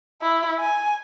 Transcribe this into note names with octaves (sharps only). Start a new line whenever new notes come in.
E4
G#5